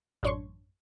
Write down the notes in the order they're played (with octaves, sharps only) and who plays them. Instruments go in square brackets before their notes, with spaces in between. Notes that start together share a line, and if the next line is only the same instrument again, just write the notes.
[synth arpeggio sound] A1 F#2 D4 C#5 C6 C#6